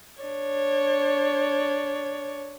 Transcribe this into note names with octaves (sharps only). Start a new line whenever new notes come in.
D4 C#5